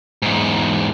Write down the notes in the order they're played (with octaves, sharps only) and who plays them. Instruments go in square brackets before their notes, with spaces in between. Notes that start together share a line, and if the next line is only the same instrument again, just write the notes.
[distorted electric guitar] E2 G#2